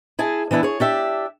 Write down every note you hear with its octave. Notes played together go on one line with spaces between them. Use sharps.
E4 G#4 G#5 A5
E3 B3 D4 E4
G#4 C#5
D4 G4 E5